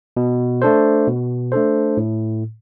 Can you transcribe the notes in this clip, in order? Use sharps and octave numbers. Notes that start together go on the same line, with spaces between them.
B2
A3 D4 A4 C5
B2
A3 D4 A4 C5
A2